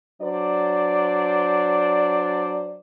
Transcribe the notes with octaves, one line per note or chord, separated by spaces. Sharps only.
F#3 D4 C5 D5